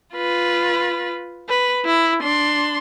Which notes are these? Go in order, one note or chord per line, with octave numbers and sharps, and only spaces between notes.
F4 B4
B4
E4
D4 C6